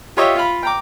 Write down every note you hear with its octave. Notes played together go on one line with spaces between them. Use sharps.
F4 G4 C#5 D#5 E5
F4 F5 B5
G5 A#5 D6